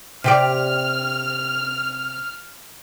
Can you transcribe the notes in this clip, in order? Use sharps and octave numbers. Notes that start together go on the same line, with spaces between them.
C3 G4 D5 F6